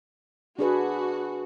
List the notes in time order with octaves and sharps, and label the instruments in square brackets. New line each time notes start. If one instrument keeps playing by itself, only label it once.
[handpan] D4 G#4 B4 [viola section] F#4